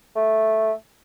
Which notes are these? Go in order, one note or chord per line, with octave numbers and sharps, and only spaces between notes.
A3